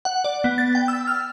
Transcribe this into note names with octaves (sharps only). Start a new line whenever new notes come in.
F#5
D5
B3
A6
G5
E6
F6